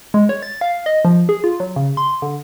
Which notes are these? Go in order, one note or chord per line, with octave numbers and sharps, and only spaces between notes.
G#3
C#5
A6
F5
D#5
F3
G#4
F4
F#3
C#3
C6
D3